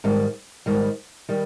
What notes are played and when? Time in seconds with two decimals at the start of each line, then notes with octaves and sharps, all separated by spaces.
0.04 G#2 D#3 G3
0.66 G#2 D#3 G3
1.29 D#3 G3